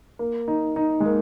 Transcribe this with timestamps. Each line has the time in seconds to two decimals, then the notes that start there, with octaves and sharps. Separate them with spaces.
0.19 A#3
0.48 D#4
0.76 D#4
1.00 G#3
1.05 A#3